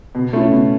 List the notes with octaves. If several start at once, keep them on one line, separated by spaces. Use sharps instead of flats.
B2
A3 C#4 E4
B2